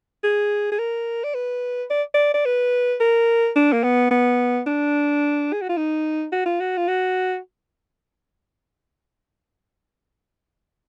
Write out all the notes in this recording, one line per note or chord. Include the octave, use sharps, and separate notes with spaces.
G#4
G#4
A#4
D5
B4
D5
D5
D5
B4
A#4
D4
A#3
B3
B3
D4
G#4
F#4
F4
D#4
F#4
F4
F#4
F4
F#4